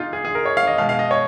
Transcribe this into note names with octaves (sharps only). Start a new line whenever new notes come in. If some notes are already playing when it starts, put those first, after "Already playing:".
Already playing: A#2 D#4 F4 G#4
G#4
G#4
A#4
C#5
F5
D#5
B2 G#3 F5
F5
D#5
C#5